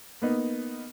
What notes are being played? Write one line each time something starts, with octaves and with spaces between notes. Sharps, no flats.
A#3 B3 D#4